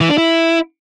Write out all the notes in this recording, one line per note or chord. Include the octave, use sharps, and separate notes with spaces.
E3
D4
E4